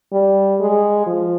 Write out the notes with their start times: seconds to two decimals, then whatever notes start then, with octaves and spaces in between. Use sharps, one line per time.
0.13 G3
0.60 G#3
1.07 F3